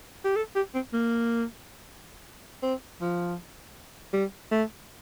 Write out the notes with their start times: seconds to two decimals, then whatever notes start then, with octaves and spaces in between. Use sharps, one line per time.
0.25 G4
0.36 A4
0.55 G4
0.74 C4
0.93 A#3
2.63 C4
3.01 F3
4.13 G3
4.51 A3